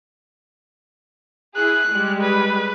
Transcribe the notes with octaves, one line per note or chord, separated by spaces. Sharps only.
E4 G#4 F#6
G3 G#3
B4